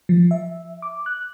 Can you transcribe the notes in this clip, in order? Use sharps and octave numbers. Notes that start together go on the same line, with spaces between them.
F3
E5
D6
F#6